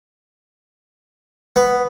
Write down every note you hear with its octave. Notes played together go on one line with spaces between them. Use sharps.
B3